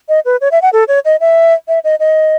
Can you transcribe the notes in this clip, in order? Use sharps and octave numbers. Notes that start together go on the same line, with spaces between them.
D#5
B4
C#5
E5
F#5
A4
C#5
D#5
E5
E5
D#5
D#5